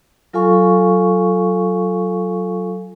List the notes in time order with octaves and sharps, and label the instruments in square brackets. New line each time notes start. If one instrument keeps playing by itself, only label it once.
[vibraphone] F#3 F4 A4 F5 G#5 C#6